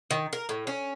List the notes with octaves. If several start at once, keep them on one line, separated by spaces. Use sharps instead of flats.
D#3
A#4
A2
C#4